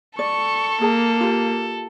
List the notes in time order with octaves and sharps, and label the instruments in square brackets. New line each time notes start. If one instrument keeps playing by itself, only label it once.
[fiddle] A4 [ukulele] D5 [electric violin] C#6
[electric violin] A#3 [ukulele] G#4 A5
[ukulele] F4 G4